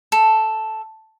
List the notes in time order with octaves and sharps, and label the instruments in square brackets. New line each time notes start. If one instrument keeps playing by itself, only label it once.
[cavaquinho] A4